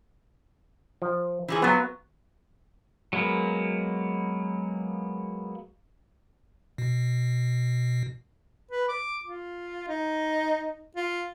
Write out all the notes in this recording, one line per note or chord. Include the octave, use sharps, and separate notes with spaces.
F3
E3 F3 G#4
F#3 B3 F4
F#3 G#3 A#3 B3
B2
B4
D6
F4
D#4
F4